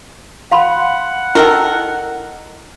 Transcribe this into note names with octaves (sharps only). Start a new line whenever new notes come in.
F5 F#5 B5 C6
D#3 E4 A4 A#4